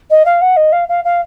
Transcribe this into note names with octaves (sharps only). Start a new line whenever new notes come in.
D#5
F5
F#5
D#5
F5
F5
F5